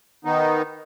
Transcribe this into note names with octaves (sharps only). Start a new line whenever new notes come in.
D#3 B3 D#4